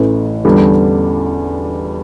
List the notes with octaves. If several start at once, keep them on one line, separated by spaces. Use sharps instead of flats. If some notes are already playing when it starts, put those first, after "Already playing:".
Already playing: A1 A2 E3
E2 D3 G3